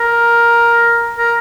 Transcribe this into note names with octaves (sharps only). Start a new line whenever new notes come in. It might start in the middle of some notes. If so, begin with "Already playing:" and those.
Already playing: A#4
A#4